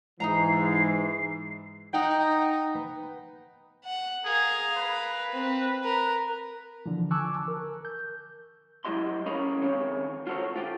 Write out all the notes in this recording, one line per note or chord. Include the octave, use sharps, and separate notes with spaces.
G#2 E3 D#4 A#4 A#5 C7
D#4 F#5 G5
B3
F#5
G#4 A#4 F5
B4
C4
A#4
D3 E3 F3
G#5 A5 C#6 D6 E6 F#6
A#4
G6
F#3 E4 G4 D#5 C6
C#4 G#4 A#4 C#5 F5 B5
D#3 C4 G#4 C#5
F4 F#4 A4 A#4 C5 C#5
F4 G4